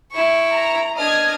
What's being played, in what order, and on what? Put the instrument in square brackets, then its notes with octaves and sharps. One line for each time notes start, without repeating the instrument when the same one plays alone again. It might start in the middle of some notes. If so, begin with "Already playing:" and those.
[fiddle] E4 C#6
[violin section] A#5
[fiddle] D4 F6 [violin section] D#5 D#6 G#6